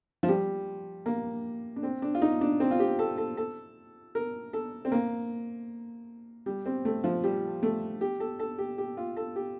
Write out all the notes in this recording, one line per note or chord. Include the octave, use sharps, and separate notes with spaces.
F3
G3
A#3
D4
C4
D4
F4
D#4
D4
C4
F4
G4
A4
A4
A4
A#4
A4
C4
A#3
G3
C4
A3
F3
G3
A3
G4
A4
A4
G4
G4
F4
A4
G4